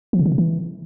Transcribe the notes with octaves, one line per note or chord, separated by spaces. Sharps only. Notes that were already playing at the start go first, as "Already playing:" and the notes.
F3
C#3
D#3
C3
E3